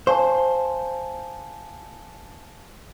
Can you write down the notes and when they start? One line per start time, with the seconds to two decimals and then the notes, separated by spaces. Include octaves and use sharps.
0.07 C5 F5 G#5 A5